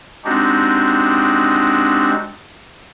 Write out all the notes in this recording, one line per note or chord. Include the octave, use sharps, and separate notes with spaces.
G#3 C4 D4 D#4 F#4 G4